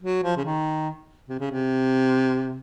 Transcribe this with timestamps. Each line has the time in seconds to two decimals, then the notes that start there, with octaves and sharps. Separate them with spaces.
0.03 F#3
0.24 F3
0.37 C#3
0.45 D#3
1.29 C3
1.39 C#3
1.51 C3